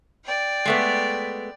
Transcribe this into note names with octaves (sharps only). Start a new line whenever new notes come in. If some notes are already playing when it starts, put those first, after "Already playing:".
D5 G5
G#3 A3 B3